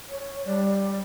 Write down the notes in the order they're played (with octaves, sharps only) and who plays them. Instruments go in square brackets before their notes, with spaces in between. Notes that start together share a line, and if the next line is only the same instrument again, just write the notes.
[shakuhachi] C#5
[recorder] G3 [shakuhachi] D5